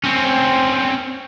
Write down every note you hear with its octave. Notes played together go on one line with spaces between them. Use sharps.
C4 C#4